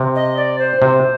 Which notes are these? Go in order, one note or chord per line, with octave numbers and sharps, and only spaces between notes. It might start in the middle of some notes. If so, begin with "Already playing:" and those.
Already playing: C3
D#5
D5
C5
C3 C5